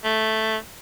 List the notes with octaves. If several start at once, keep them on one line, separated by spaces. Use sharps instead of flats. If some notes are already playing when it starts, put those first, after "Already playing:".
A3